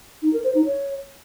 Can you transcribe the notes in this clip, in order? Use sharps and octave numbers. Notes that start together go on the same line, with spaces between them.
D#4
A#4
C5
D#4
C#5